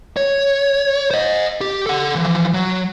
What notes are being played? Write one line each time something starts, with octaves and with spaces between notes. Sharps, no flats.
C#5
C5 D#5
G4
A4 F#5
E3 F3
F#3